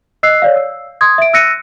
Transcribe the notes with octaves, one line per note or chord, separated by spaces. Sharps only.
D#5 E6 F#6 C7
C#5 D5 F5
E6
C6 D#6 G#6
E5 D7
E6 F#6 A#6 C#7 D#7